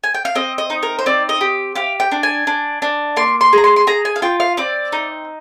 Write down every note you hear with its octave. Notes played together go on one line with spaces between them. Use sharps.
G#5
G5
F5
C4 D#5
D#5
D#4
A#4
C5
C4 D5
D#5
G4
G4 F5
G5
D4
G#5
D4
D4
A#3 C6
C6
G#4 A#5
C6
C6
G#4 A#5
G#5
F5
F4 G5
F5
C4 D5
D#4